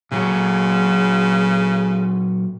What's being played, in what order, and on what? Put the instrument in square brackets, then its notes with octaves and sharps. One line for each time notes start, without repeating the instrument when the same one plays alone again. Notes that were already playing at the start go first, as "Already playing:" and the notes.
[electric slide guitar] A#2 F#3 F#4 [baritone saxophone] C#3